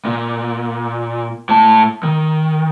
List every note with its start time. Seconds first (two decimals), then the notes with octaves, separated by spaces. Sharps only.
0.05 A#2
1.49 A2 A5
2.03 D#3